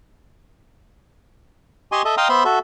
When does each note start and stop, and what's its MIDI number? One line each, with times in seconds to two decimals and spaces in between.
1.92 2.02 67
1.92 2.02 75
1.92 2.02 80
1.92 2.02 84
1.92 2.02 85
2.05 2.15 69
2.05 2.15 75
2.05 2.15 76
2.17 2.28 75
2.17 2.28 77
2.17 2.28 79
2.17 2.28 82
2.17 2.28 84
2.17 2.28 87
2.29 2.44 59
2.29 2.44 72
2.29 2.44 76
2.29 2.44 83
2.29 2.44 84
2.45 2.59 66
2.45 2.59 69
2.45 2.59 76